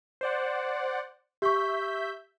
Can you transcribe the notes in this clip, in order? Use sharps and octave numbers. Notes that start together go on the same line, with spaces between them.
C5 D5 F#5
G4 E5 C#6 G6 B6